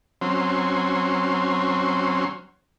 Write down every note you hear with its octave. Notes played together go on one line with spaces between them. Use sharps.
F#3 C4 C#4 C6